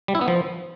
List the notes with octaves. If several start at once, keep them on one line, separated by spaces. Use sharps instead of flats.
G3
E4
B3
F3